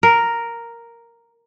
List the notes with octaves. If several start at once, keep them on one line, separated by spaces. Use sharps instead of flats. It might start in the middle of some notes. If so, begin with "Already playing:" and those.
A#4